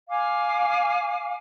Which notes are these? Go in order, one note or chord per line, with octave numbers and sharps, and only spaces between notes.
F5 G#5 D6